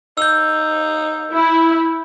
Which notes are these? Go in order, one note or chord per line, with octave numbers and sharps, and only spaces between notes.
D#4 E6 G6
E4